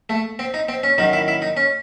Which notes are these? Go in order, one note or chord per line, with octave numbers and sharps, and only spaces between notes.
A3
C4
D#4
C4
C#4
F#2 D#3 D#4
E4
E4
D#4
C#4